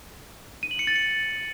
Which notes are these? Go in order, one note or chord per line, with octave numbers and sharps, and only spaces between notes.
D#7
F#7
C#7
A6
C#7